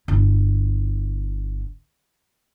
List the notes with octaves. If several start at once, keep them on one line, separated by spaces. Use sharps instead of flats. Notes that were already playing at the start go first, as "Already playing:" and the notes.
G1 E4